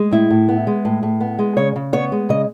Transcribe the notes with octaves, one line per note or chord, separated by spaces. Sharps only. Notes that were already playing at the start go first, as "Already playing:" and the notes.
Already playing: G#3
A2 E4
A2
B3
G#3
A2
A2
B3
G#3
C#3 C#5
C#3
B3 C#5
G#3
C#3 D#5